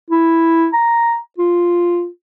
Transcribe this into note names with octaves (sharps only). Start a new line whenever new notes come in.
E4
A#5
F4